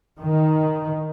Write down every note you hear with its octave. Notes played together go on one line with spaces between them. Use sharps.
D#3